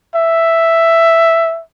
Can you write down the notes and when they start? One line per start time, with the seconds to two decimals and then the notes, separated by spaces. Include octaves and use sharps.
0.16 E5